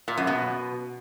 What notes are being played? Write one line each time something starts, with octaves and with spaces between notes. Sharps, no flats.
A#2
F#2
B2